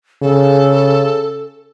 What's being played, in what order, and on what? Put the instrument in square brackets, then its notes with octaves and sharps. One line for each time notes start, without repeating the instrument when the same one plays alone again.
[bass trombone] C#3 [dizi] A4